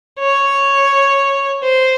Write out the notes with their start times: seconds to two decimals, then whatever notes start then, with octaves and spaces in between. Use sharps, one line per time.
0.20 C#5
1.62 C5